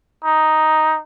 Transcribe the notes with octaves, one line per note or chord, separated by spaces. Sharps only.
D#4